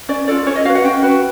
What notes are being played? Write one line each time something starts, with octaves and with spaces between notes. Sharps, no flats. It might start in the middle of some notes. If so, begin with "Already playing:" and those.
C#4 D5
F4 A4 D5
C#4 C#5
D#5
F#4 B4 F5
F#5
C#4 G5
F#4 B4